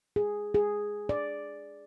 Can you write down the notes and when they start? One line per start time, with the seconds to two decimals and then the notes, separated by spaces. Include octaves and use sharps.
0.16 G#4
0.54 G#4
1.09 D5